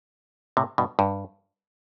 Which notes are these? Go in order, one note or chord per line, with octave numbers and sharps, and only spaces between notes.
A2 C3
G2 B2
G2